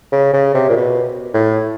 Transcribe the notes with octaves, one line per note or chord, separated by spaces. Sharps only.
C#3
C#3
C3
A#2
B2
A2